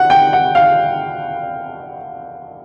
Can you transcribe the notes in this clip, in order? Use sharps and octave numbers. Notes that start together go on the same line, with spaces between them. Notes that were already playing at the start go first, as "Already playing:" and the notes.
Already playing: F#5
G5
F#5
F5